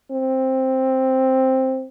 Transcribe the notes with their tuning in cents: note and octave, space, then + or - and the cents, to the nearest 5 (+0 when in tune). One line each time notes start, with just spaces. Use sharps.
C4 +5